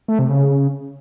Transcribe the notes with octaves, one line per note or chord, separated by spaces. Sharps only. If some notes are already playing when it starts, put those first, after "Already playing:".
A3
C3
C#3